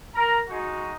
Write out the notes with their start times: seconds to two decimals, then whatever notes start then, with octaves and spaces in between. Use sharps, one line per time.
0.15 A#4 A#5
0.48 G#3 D#4 F#4